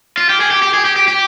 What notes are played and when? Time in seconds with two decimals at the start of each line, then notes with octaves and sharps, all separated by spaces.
0.17 F4
0.29 G4
0.40 G#4
0.51 G4
0.62 G4
0.74 G#4
0.85 G4
0.96 G4
1.08 G4